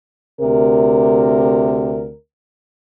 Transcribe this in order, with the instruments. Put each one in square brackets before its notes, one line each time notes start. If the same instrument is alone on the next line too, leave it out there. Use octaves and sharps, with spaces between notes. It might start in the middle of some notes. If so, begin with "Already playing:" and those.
[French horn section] D2 C3 A#4